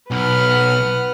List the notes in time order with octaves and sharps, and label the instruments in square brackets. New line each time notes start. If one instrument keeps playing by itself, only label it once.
[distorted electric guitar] B1 [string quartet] B4 F#5 F6